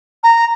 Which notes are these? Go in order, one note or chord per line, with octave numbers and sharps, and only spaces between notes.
A#5